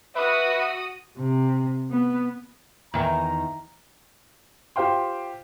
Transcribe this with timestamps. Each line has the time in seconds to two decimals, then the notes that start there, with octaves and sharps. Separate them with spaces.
0.16 F#4 B4 E5 D#6
1.18 C3
1.91 B3
2.94 E2 D#3 A#5
4.76 F4 G4 C5 F5 G5 C6